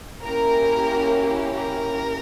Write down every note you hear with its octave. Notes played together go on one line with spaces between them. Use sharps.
A#3 C#4 E4 G4 A#4
A#4